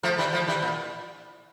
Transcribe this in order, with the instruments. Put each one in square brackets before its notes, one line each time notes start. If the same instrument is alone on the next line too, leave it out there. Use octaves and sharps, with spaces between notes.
[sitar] F3 A3
E3 G3
F3 A3
E3 G3
A#2